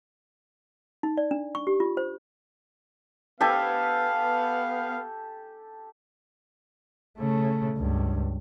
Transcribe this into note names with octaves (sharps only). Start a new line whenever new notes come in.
D#4
D5
D4
C#6
G4
F4
C5
B3 G4 A4 F5 G#5
C#3 A3
C#2 G2